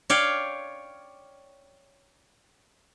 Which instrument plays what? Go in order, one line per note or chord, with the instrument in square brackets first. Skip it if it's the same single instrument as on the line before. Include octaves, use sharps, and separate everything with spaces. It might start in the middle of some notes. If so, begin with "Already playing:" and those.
[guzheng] C#5 D5 F5 G5